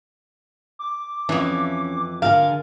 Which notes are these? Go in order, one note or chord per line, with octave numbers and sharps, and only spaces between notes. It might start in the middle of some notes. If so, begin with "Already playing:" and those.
D6
F2 E3 C#4
D3 G#4 A#4 F5